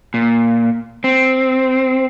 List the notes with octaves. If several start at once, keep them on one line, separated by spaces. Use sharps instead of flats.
A#2
C4